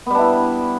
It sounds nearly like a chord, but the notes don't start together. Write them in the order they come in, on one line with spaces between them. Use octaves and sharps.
B3 G3 D4 E4